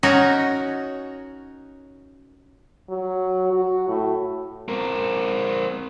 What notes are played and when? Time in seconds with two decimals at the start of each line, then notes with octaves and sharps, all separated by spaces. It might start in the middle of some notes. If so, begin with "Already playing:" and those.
0.03 C#4 D#4 F#4 A#4 C#5
2.90 F#3
3.53 F#4
3.88 A2
4.68 C4 A#4